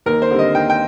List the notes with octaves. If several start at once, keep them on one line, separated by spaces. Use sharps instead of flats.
D#2 A#4
C5
D3 G3 C4
D#5
D#2 G5
G5